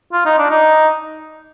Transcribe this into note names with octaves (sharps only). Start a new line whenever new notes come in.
F4
D#4
D4
D#4